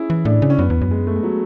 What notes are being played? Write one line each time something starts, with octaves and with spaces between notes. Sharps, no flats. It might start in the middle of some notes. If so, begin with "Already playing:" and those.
Already playing: C#4 E4 G#4
E3
A2 D4
C#3
C#4
F#2 B3
E2
F#2
G#3
A3
G#3
F#3